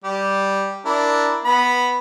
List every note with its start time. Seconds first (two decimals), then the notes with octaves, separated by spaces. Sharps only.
0.04 G3 G4
0.85 D4 E4 A#4
1.45 B3 B5